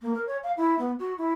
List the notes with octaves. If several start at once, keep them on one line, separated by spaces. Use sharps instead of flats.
A#3
A#4
C#5
F5
E4
B3
F#4
E4